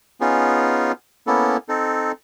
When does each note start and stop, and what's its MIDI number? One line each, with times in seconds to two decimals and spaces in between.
0.21 0.92 59
0.21 0.92 61
0.21 0.92 63
0.21 0.92 65
0.21 0.92 68
1.27 1.57 58
1.27 1.57 59
1.27 1.57 61
1.27 1.57 64
1.27 1.57 69
1.69 2.12 60
1.69 2.12 63
1.69 2.12 69